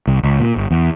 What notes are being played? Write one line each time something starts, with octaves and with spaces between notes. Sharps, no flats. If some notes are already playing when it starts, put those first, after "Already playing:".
C2
C#2
A#2
G1
E2